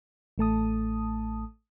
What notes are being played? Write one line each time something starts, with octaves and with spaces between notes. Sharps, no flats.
A1 A3 A5 D#6